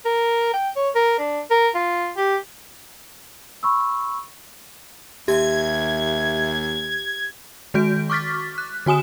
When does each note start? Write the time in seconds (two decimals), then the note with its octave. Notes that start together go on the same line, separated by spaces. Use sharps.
0.05 A#4
0.53 G5
0.76 C#5
0.95 A#4
1.18 D4
1.50 A#4
1.75 F4
2.17 G4
3.63 B5 C#6 E6
5.28 D#2 G4 E5 G#6
7.74 D#3 G#3 F#4 G6 D7
8.10 C#6 D6 F6 A6 B6
8.58 F#6
8.86 D3 F#4 G#5 D#6 E7